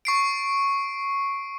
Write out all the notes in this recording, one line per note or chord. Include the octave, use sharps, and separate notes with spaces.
C#6 C7 D7